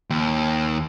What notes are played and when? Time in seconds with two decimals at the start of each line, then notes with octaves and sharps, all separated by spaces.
0.10 D#2